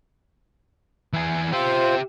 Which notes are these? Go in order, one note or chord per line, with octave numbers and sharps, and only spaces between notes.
E3 G#4
F4 G4 C5 E5